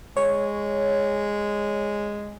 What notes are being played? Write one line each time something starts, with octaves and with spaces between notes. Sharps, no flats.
G#3 C#5